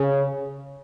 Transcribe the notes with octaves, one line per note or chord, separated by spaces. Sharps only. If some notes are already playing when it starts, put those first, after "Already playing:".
Already playing: C#3